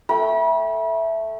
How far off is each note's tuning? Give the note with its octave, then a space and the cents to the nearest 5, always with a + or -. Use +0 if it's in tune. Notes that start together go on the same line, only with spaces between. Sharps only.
A3 +0 G5 +0 B5 -40